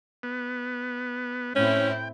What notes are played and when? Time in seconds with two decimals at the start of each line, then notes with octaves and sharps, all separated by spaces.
0.23 B3
1.56 A2 C4 C#4 E4 G5